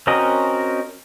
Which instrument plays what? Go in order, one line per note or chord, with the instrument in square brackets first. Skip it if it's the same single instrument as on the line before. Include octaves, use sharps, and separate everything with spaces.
[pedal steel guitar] C4 C#4 F#4 A#4 D#5